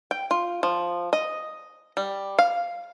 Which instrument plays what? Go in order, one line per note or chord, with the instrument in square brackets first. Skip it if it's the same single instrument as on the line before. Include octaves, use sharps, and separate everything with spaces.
[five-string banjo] G5
F4
F3
D#5
G3
F5